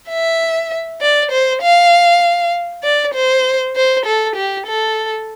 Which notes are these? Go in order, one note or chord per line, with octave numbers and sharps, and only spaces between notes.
E5
D5
C5
F5
D5
C5
C5
A4
G4
A4